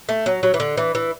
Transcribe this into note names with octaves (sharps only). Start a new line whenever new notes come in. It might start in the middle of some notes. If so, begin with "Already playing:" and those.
A3
F#3
F#3
E3
D3
E3
E3